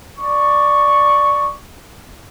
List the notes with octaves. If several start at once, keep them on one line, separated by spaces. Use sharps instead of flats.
D5 C#6